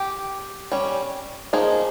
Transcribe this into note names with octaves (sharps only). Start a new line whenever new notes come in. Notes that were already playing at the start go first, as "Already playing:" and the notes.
Already playing: G4
G3 C#4
F3 A#3 D#4 G#4